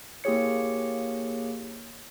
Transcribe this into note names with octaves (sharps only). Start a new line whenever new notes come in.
A#3 E4 G4 G#4 C#5 C#7